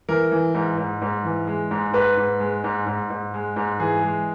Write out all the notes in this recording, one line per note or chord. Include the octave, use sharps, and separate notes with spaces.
E3 A#4
E3
G#2
G#2
G#2
E3
G#3
G#2
G#2 B4
G#2
G#3
G#2
G#2
G#2
G#3
G#2
E3 G#4
G#3